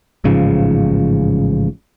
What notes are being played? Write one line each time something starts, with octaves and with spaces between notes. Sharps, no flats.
A1 G#2 C#3 F3